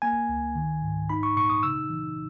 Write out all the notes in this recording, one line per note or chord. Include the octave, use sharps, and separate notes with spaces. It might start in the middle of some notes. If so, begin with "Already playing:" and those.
A#3 G#5
C#2
D#3
G#2
D#4 B5
C#6
A#2 C#6
D#6
C#3 E6
E3